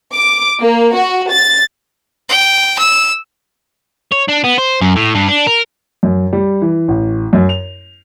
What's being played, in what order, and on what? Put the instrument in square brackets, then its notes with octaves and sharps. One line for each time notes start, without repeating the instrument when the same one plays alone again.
[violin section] D6
A#3
F#4
A6
[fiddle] G5
E6
[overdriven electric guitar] C#5
D4
B3
C5
F#2
A2
G2
D4
A#4
[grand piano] F#2
G3
E3
A1
F#2
F7